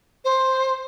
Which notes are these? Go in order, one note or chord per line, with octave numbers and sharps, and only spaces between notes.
C5